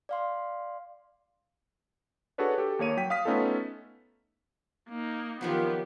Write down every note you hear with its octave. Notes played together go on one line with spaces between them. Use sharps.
D5 F5 C6
D4 F#4 G#4 A4 B4 C#5
G4 A4
D#2 A#3 C#5 D#7
F#3 G5 B6
F5 D#6 B6
A3 B3 C#4 D#4 F4 A4
A#3 D#4
D#3 F3 F#3 B3 F4 G4